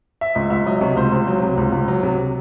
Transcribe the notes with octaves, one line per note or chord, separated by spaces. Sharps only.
E5
C#2 D#5
C#2 E5
F#3 D#5
C3 C#5
C#2 C5
C#2
F#3
C3
C#2
C#2
F#3
C3